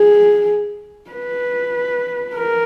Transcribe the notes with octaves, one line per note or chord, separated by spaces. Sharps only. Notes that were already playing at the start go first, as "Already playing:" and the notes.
Already playing: G#4
B4
A#4